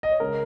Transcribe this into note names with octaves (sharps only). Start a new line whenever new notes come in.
D#5
C#5
C#3 G#3 A#4